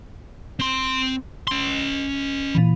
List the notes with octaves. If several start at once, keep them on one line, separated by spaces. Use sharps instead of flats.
C4 C6
C#4 C6
A#2 E3